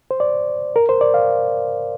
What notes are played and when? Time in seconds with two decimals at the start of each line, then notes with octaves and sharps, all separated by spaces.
0.11 C5
0.20 D5
0.76 A#4
0.89 C5
1.01 D5
1.14 F5